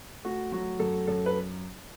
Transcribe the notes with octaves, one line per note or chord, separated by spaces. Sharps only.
A3 F#4
F#3 F#4
F#2 A4
F#2 A4
B4